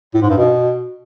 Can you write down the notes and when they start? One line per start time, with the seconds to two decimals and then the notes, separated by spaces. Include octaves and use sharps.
0.14 A2
0.22 G#2
0.30 G2
0.38 B2